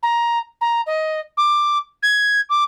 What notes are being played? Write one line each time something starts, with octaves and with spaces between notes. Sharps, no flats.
A#5
A#5
D#5
D6
G#6
D6